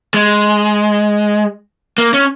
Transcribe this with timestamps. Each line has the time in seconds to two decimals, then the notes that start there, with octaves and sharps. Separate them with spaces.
0.14 G#3
1.98 A#3
2.14 C#4